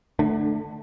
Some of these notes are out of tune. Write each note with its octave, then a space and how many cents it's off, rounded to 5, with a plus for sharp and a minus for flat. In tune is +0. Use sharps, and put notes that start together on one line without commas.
D3 +20 A3 +0 D4 +45